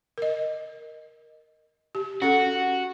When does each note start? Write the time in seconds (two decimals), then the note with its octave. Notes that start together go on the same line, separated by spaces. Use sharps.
0.18 A#4 D#5
1.95 G4
2.22 C#4 F#4 A4